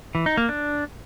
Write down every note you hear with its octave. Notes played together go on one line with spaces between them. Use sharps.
E3
D#4
A#3
D4